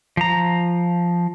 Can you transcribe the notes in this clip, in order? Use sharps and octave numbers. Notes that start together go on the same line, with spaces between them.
F3 A#5